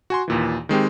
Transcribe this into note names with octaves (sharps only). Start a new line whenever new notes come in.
F#4 G#5 C6
D#2 A#2 E3
D#3 G#3 C4 G4